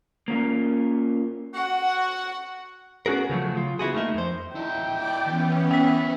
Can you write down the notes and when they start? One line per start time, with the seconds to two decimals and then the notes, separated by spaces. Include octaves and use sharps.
0.28 A#3 C#4 F4 A#4
1.54 F#4 F#5
3.06 B3 C#4 F#4 G#4 A#4
3.30 C#3 F3 F#3 A3
3.55 C#3 F4
3.79 B3 E4 F#4 G#4
3.94 A3 A#3 D#4 E5
4.14 F2 C5
4.55 E4 D#5 G5
4.93 D5 D6
5.26 E3 B3 C#4
5.71 E4 B4 G5 B6